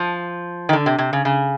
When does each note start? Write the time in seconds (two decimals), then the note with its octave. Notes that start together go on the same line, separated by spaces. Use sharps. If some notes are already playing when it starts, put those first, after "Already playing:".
Already playing: F3
0.69 D#3
0.73 D3
0.86 C3
0.98 C3
1.13 C#3
1.25 C#3